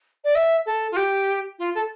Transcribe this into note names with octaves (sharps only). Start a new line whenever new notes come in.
D5
E5
A4
F4
G4
F4
A4